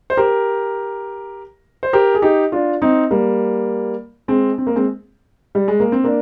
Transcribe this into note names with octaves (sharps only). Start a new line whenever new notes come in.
C5
G4 A#4
C5
G4 A#4
G#4
D#4 G4
D4 F4
C4 D#4
G3 A#3
G#3 C4
C4
A#3
G#3 C4
G3
G#3
A#3
C4
A#3 D4